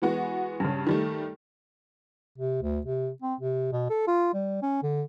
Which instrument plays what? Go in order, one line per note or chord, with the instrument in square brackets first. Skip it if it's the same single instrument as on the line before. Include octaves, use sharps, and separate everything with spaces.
[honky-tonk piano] E3 G#3 B3 F#4
G2 C#3
D#3 G3 A3
[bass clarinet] C3
D2
C3
C4
C3
B2
A4
F4
G3
C#4
D3